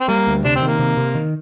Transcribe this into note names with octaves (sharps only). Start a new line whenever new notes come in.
C4
G3 A#3
D2
C3 D4
C4
D#3
A#3
C3
C3
D#3